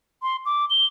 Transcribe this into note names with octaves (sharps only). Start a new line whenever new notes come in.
C6
D6
G7